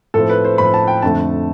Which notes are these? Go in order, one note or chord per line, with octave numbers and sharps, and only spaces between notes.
A2 F3 C4 A4
B4
C5
A2 F3 C4 B5
A5
G5
F2 D3 F3 A3 A5